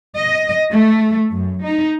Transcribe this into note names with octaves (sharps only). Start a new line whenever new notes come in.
D#5
A3
F#2
D#4